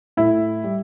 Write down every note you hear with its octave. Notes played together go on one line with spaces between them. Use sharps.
A2 E4
G3